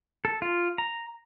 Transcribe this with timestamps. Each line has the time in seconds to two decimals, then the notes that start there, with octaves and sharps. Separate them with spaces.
0.25 A4
0.42 F4
0.78 A#5